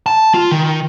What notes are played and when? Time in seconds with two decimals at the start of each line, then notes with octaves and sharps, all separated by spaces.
0.06 A5
0.34 F4
0.51 D#3